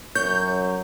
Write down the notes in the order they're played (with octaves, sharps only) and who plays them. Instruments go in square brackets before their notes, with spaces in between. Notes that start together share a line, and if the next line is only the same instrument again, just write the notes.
[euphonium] F#2 [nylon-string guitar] C#5 [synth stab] G6